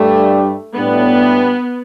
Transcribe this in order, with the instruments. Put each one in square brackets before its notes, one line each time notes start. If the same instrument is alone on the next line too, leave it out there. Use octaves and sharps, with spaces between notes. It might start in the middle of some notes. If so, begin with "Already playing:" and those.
Already playing: [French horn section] G2 G3 D4 [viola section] A3
[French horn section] A2 G3 D4 [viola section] B3